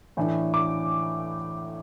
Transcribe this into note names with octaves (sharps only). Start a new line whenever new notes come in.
A2 E3 A3 D4
D6